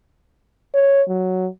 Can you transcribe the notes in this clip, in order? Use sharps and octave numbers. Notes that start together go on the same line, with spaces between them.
C#5
F#3